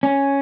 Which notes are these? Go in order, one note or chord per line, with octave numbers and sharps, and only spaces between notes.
C#4